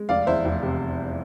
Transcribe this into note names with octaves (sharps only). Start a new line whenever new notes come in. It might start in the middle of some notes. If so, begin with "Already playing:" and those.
Already playing: G#3
F1 D5 F5
E2 C5 E5
F1
C3